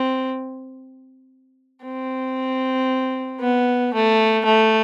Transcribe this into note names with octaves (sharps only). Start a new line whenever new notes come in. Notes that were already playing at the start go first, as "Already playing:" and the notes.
Already playing: C4
C4
B3
A3
A3